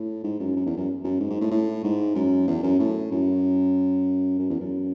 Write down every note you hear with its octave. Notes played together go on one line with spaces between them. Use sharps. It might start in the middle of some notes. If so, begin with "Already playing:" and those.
Already playing: A2
G#2
F#2
F#2
E2
F#2
F#2
G#2
G#2
A2
A2
G#2
F#2
E2
F#2
A2
F#2
F#2
E2
F#2